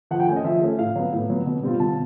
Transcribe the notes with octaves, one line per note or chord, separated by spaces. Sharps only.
F3 F#5
G5
A3 G#5
C#4 D#5
F3 E5
A3 C#4
A2 F5
F#3 B3
A2
F#3 B3
B2
G3 C4 F4
B2 A5